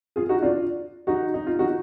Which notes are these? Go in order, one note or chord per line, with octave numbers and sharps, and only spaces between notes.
F4 G#4
D#4 F#4
D4 F4
D#4 F#4
D#4
F4
D#4 F#4